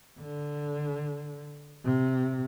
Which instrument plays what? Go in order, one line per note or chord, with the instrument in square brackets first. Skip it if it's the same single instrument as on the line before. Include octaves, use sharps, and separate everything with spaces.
[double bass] D3
C3